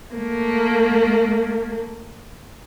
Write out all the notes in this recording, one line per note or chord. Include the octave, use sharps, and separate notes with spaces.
A3 A#3